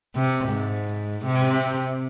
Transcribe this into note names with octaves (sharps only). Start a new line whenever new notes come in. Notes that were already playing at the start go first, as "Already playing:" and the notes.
C3
G#2
C3